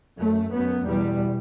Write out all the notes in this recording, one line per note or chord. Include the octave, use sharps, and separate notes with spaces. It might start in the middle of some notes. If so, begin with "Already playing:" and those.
F#2 A3
F#2 B3
E2 B2 G3